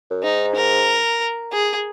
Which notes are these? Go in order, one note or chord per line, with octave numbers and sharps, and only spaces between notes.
F#2
G#2 D#4
A#4
G#4